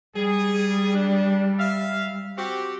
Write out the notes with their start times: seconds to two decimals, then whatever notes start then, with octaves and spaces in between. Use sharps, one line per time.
0.16 G3 G#4
0.95 D4
1.58 E5 F5
2.37 C4 F#4 G4